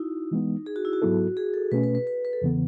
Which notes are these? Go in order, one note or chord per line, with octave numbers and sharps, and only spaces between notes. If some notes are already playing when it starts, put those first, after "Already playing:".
Already playing: D#4 E4 F#4
E3 G#3 B3
G#4
F#4
E4
F#4
G#2 F#3 B3 E4 A4
G#4
A4
B2 A3 C#4 B4
B4
B4
B4
B4
A4
E2 C#3 E3 B3